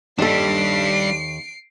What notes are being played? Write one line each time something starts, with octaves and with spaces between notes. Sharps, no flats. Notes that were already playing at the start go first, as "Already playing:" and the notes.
D#2 G3 D4 A4 C7 D7